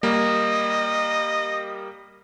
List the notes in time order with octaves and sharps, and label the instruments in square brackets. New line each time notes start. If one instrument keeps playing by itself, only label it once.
[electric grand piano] G3 A#3 [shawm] D#5